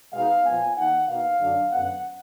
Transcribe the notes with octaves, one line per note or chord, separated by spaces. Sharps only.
B2 G#3 B3 D#4 F5
A#2 F3 B3 G#5
D#3 A#3 D#4 F#5
B2 A#3 D#4 F5
F#2 D3 F#3 D4
F#2 D3 F#3 B3 F#5